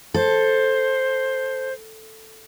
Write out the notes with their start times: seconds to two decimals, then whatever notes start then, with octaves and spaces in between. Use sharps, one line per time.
0.14 A4 C5